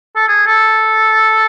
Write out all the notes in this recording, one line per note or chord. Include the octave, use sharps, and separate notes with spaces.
A4
G#4
A4